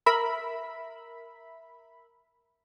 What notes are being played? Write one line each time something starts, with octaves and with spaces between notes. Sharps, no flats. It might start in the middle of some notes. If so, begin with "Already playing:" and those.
A#4 E5 B5